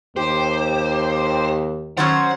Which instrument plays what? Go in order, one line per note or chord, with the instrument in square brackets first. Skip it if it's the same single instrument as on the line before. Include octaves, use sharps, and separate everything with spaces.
[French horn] D#2 [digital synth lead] G4 [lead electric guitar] C5
[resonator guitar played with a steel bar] D#3 F#3 C#4 [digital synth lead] C5 [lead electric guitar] F#5